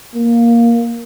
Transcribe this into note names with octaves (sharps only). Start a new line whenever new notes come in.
A#3